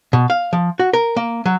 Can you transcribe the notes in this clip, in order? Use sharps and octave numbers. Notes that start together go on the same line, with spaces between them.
B2
F5
F3
F#4
A#4
A#3
F#3